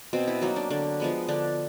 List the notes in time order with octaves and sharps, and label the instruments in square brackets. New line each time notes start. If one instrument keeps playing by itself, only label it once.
[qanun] B2 C4
E4
F#3 A#3 D#4
D4
D3 D4
F3 G#3 B3
D3 D4